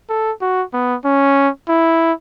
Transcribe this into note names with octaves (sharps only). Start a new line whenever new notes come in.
A4
F#4
B3
C#4
E4